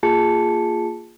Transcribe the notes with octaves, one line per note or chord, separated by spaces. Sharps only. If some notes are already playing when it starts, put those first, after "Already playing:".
A#3 F4 G#4 A5 C#7